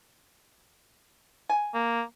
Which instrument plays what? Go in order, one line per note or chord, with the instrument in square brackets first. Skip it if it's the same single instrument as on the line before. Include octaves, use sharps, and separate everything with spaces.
[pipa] G#5
[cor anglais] A#3